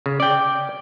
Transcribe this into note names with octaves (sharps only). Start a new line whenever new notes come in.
C#3
D5 G5